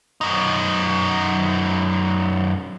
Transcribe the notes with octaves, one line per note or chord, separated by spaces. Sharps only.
F#2 D#4